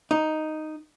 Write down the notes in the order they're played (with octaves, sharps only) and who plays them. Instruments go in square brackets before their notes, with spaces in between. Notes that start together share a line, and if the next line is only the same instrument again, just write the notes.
[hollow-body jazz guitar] D#4